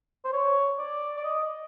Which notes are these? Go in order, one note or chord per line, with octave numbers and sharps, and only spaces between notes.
C5
C#5
D5
D5
D#5